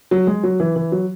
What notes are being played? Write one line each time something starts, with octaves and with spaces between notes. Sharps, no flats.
F#3
G#3
F#3
E3
E3
F#3